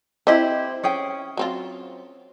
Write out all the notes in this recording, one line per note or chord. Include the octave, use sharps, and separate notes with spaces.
C4 E4 G4 C5 D#5
C#4 G#4 G5
F#3 C4 F4